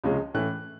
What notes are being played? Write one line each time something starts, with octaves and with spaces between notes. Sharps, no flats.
C#2 C3 F3 G#3 C#4
A2 E3 A3 C#4 F#6